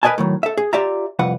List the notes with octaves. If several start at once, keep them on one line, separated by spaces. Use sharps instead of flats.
A#4 B4 D5 D#5 G#5 A5
A2 D#3 F#3
A4 E5
G#4
F4 G4 D5 E5 A#5
C2 F2 B4 F#5